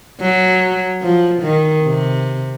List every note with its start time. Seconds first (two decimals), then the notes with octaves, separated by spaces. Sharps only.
0.21 F#3
1.02 F3
1.42 D#3
1.83 C3